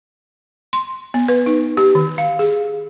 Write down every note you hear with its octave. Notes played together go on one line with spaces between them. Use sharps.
C6
B3
B4
D#4
G4
D#3
F5
G#4